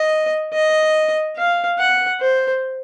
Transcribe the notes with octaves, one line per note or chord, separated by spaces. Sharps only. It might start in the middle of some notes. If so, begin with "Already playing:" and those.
Already playing: D#5
D#5
F5
F#5
C5